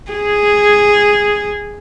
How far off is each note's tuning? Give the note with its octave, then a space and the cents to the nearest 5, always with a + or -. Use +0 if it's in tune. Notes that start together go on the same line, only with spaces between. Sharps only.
G#4 -5